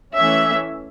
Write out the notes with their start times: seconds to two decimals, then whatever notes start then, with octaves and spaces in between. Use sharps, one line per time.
0.15 E3 A3 C#4 E5